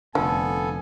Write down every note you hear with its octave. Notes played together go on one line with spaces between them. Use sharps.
F1 D3 F3 B3 A4 G#5